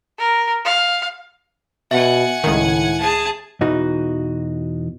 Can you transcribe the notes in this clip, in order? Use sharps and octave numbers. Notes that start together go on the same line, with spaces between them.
A#4
F5
B2 E5 F#5 G#5
C#2 A2 D#3
G#4 A5
E2 B2 E3 D#4 F#4